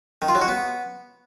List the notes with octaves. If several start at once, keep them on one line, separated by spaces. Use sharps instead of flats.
D#3
F4
F#3
F#4
B3